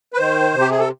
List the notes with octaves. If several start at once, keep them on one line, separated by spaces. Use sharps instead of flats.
B4
D#3 C5
C3
G4
G#4
A4